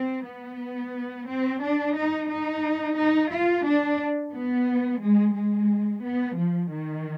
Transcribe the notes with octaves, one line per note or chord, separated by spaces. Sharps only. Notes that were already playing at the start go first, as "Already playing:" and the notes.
Already playing: C4
B3
C4
D4
D#4
D#4
D#4
F4
D4
B3
G#3
G#3
B3
F3
D#3